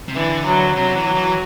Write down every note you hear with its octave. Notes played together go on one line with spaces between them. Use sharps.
C3
D3 E3
F#3
C3 F#3
E3
F#3
E3